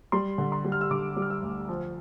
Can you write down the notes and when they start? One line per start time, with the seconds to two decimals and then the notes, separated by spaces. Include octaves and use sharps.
0.12 G3 C6
0.38 D3
0.52 C6
0.65 G3
0.72 F6
0.81 E6
0.91 D3 D6
1.17 G3
1.22 F6
1.30 E6
1.43 D2
1.69 F3